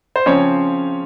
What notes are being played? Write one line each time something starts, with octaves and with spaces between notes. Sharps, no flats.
C5
C#3 F3 C4 C#4 C#5